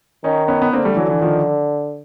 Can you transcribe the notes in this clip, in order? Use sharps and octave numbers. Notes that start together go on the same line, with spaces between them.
D#3 C#4 D#4
B3 C#4
B3
D3 A#3 C4
G3 A3
E3 F#3
E3
D#3 F3